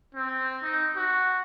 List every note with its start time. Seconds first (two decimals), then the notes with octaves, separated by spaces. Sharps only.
0.15 C4
0.63 D#4
0.97 F#4